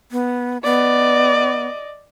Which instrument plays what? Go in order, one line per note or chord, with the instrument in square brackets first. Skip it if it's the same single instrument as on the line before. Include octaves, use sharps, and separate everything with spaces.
[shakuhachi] B3
[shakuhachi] B3 [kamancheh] D5 D#5